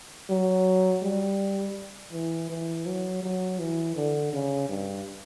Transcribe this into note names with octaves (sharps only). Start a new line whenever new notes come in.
F#3
G3
E3
E3
F#3
F#3
E3
D3
C#3
G2